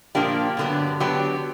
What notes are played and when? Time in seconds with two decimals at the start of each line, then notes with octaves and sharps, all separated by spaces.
0.15 A#2 F3 A#3 D4 G4
0.57 G2 D3 F#3 B3 D4
1.00 D3 F#3 B3 D4 G4